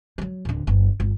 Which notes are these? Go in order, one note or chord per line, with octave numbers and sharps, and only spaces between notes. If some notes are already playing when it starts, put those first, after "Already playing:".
F3 F#3
D1 D3
F#1 B3
G1